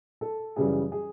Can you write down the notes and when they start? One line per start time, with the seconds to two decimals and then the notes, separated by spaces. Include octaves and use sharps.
0.21 A4
0.56 F#2 C#3 E3 G3 G#4
0.92 G#4